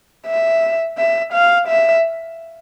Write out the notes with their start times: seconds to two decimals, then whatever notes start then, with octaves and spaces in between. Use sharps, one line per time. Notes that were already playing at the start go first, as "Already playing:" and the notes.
0.27 E5
0.97 E5
1.33 F5
1.68 E5